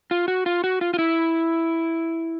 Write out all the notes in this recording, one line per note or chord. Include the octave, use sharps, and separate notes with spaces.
F4
F#4
F4
F#4
F4
F4
E4